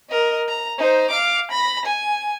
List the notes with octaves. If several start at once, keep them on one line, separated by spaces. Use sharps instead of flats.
A#4 D#5
A#5
D#4 C5
F5 D6
B5 A#6
G#5